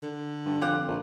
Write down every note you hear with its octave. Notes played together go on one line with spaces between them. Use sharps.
D3
G2
F2 F4 G4 F#5
A#1